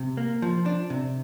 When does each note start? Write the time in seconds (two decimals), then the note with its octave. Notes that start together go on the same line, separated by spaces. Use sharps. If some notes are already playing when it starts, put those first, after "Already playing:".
Already playing: C3
0.17 A#3
0.42 F3
0.66 D4
0.90 C3